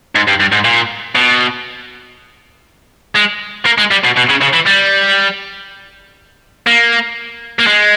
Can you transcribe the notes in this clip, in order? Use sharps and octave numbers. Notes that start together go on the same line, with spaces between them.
G#2
G2
G2
G#2
A#2
B2
G#3
A#3
G#3
G3
B2
B2
C#3
C#3
E3
G3
A#3
A#3
G#3